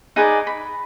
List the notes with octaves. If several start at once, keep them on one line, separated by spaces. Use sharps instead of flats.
D#4 G#4 B4 D5
B5